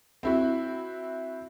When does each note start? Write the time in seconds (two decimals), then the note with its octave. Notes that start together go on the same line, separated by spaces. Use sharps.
0.23 C4 E4 F#4